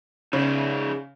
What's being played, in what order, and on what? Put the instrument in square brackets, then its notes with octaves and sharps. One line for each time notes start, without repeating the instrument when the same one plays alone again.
[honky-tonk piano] C#3 [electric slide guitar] D#4 G#4 D5